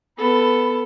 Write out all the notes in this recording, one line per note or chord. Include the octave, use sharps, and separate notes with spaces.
B3 A4 B5